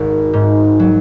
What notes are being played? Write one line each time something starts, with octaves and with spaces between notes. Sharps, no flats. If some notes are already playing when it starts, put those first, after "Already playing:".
Already playing: G#1 G#2 F#4 G#4
G#2
F#3